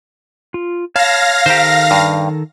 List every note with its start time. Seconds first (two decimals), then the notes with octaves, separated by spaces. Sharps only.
0.54 F4
0.96 C#5 F5 A5 B5 A#6
1.46 D#3 G4 A4 C5 A#5
1.91 G2